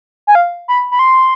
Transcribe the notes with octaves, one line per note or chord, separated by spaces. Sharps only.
G#5
F5
B5
B5
C6